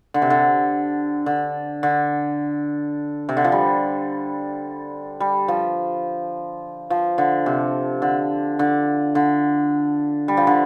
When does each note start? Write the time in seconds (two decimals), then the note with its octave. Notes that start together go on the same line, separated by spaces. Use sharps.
0.14 D3
0.22 C3
0.30 D3
1.26 D3
1.83 D3
3.29 C3
3.37 D3
3.44 F3
3.52 G3
5.20 G3
5.48 F3
6.90 F3
7.18 D3
7.46 C3
8.02 D3
8.59 D3
9.15 D3
10.28 G3
10.37 F3
10.47 D3